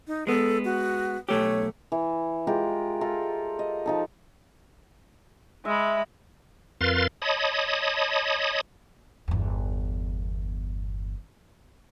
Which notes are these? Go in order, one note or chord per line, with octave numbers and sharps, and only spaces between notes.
D#4
G#3 B3 A4
F#4
B1 A3 G4 C#5
E3
G#3 F4 G4 A#4
F4 A4 A#4
D#5
F3 D#4 A4
G#3 E5 B5
F2 A#4 B4 F5 C6 A6
C#5 D#5 A5 B5 D#6
G1 E2